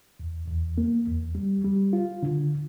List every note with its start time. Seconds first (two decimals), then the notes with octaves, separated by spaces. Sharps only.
0.20 E2
0.48 E2
0.78 A#3
1.07 E2
1.35 G3
1.64 G3
1.93 F4
2.23 D3